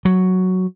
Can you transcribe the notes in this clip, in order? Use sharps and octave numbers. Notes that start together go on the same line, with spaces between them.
F#3